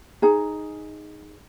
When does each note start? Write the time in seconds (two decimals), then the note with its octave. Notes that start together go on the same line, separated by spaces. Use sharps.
0.22 D#4 G#4 A#5